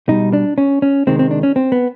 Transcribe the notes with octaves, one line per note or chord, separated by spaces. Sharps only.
B2 G3 D#4
D4
C#4
C#4
C3 D#3 G#3 C4
C4
D4
C#4
C4
B3